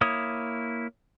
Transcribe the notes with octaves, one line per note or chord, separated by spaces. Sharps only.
A#3 E4 C#5 D#6